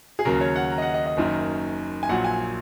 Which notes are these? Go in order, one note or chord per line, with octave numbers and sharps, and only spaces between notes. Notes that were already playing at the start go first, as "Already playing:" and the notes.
G#4
D#2 C#3 F#3 A#4
C#5
F#5
A#5
D#5
F#5
D#5
D#5
F#1 F#2 D#3
G#5
A#1 A#2 F#3 F#5
G#5